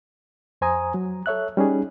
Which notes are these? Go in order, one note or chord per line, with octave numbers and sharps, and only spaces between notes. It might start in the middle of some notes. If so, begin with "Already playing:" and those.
F2 C5 G#5 A#5 D#6
F#3
A4 C#5 E5 F#6
G3 C#4 D#4 G#4